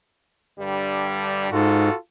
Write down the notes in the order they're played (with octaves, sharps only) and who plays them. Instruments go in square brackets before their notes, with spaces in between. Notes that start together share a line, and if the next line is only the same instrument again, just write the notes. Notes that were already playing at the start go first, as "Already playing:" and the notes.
[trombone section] G2 D3 G3
[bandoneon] G#2 [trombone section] F4 F#4 A4